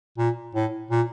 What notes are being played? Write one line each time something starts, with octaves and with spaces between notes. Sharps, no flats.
A#2
A2
A#2